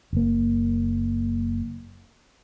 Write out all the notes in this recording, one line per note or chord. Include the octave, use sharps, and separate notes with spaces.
F#1 A#3